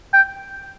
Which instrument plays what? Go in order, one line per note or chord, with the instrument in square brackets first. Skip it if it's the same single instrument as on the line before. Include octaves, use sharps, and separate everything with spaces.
[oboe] G5